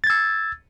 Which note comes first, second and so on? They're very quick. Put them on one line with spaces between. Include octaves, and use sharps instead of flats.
A6 G#6 E6